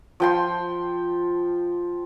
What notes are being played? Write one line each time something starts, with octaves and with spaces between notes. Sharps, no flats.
F3 G5 C6